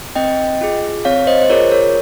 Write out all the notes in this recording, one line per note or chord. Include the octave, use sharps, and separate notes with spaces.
C4 D#5 G5
F4 G#4
C4 C#5 F5
C5 D#5
C5
F4 G#4 A#4 C#5
A#4 C#5